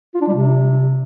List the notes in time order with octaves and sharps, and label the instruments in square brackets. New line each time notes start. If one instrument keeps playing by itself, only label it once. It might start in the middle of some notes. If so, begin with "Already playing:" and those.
[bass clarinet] F4
D4
G3
C3